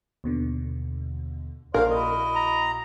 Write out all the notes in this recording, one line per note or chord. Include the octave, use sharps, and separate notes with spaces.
D#2 B2 D3
A#1 A#2 A#4 C5 D5 F5
E4 F#4 D#5
A#5